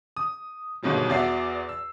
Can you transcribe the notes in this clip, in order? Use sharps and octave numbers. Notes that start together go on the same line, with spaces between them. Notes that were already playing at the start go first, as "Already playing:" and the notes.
D#6
G1 G#2 B2 D#3 F#3 G3
E2 F#4 D5 E5 C7
E6